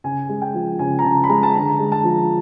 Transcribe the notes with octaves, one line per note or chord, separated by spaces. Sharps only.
C#3 G#5
G#3
G5
F3
C#3 G#5
A#5
C#3 A5
B5
G#3 A#5
A5
D3 A#5
G#3
A5
F3